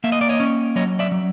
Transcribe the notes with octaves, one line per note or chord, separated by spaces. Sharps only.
A#3 E5
D#5
D5
C#5 D#5
C#4
F#3 C#5 D#5
D5 E5
F#3